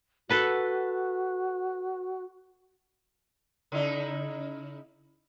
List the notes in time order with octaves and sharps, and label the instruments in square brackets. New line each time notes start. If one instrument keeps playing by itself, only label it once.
[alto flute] F#4 [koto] A4 B4 F#5
[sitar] C#3 D#4 E4